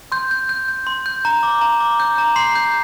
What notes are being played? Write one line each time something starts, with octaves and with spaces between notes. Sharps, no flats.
C6 G6
G6
G6
G6
C6
G6
A#5
D6
A#5
D6
G6
A#5
C6 C7
G6